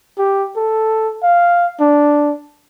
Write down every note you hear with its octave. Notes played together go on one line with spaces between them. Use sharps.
G4
A4
F5
D4